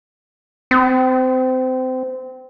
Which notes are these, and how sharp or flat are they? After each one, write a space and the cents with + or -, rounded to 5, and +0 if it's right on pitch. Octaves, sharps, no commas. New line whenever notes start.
C4 -25